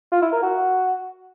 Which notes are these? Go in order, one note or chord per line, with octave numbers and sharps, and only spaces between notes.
F4
E4
A#4
F#4